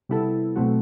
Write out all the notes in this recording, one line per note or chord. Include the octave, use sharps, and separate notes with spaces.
C3 G3 B3 E4 A4
B2 F#3 A3 C4 F#4